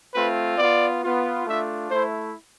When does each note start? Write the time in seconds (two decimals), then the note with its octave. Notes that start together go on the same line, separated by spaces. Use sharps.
0.14 A3 C4 F4 B4
0.58 B3 F4 D5
1.02 B3 F4
1.46 A3 D4 F4 E5
1.90 A3 E4 C5